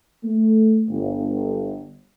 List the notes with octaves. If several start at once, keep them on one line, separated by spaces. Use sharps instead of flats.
A3
G1